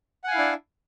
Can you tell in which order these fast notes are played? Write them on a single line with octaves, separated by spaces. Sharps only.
F#5 G#5 F5 E4 D4